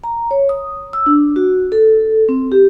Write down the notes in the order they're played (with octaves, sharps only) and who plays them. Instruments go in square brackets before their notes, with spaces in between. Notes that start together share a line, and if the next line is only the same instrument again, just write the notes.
[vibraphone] A#5
C#5
D#6
E6
D4
F#4
A4
C4
G4